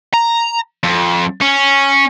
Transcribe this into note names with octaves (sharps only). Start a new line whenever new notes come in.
A#5
F2
C#4